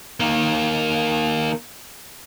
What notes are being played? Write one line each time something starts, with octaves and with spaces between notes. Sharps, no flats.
D#3 A#3